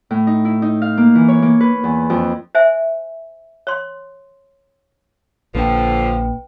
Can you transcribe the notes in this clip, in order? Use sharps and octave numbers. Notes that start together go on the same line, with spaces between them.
A2
D#4
E4
D#4
F5
A#3
E3
C#5
A#3
B4
E2
F2
C5 E5 G#5
C#5 C6
A#1 D3 F3 A#3 D4 B4 G5